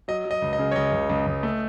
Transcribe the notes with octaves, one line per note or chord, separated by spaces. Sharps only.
F#3 D#5
F#3
D#5
C#2
D#5
C#3
C#5
C#2 D#5
C#2
C#2
C#2
A3